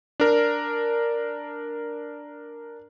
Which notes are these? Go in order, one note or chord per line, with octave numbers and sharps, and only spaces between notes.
D4 A#4